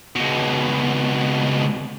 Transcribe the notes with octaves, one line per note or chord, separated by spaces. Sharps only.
C#2 B2